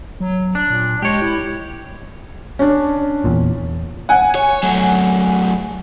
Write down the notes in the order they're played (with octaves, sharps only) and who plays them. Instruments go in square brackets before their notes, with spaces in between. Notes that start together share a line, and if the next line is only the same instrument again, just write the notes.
[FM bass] F#3
[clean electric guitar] D4
[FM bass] A#2
[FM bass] G#3 [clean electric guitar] G4 C#5
[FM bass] E4
[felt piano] C#4 D4
[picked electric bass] E2 A#2
[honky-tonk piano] F#5 G#5
[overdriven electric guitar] C#5
F#3 A3